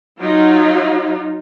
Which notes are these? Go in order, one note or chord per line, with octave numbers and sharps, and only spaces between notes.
F#3 D#4 F4